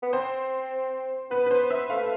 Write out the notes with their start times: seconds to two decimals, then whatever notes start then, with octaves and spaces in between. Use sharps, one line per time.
0.03 B3
0.13 C4 C5
1.31 B3 B4
1.46 B4
1.51 C5
1.70 E5
1.90 A3 F5